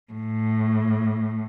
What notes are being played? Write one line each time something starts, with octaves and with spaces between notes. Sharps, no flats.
A2